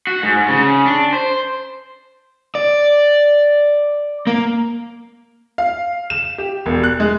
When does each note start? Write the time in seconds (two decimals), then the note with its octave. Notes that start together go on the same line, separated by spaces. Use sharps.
0.07 F#4
0.23 G#2
0.48 C#3
0.86 D4
1.13 C5
2.55 D5
4.27 A#3
5.58 F5
6.10 E7
6.38 G4
6.66 E1
6.84 F#6
7.00 G#3